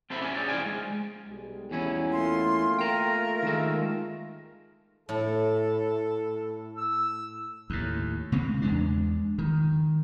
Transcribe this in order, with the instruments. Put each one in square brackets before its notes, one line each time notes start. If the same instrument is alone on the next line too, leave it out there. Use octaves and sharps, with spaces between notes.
[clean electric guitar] C4 A4 C5 E5 B5
C#4 D4 F4 G4 E5 G#5
G#4 C#5 D5
E2 D#4 F4 C5 G5 G#5
G#3
[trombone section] B1 G3 G#3
[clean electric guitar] E2 C#4 E4
[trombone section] A3 A#3 F4 [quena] C6
[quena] A#4 [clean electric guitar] G5 A#5
[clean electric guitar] D#3 G#3 E5
[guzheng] A2 [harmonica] A4
[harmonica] E6
[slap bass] D#2 A2
C#3 G#3 C4
E2 G#3 D4
D#3